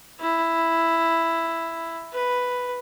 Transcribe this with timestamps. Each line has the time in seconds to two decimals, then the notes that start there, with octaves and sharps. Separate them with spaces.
0.20 E4
2.13 B4